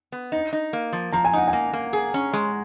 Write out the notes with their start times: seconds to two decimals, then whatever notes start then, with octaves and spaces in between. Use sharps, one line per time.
0.12 B3
0.32 D#4
0.53 D#4
0.73 A#3
0.93 F3
1.13 F3 A#5
1.25 G#5
1.33 D#4 F#5
1.48 G#5
1.53 A#3
1.73 A#3
1.93 G#4
2.14 C#4
2.33 G#3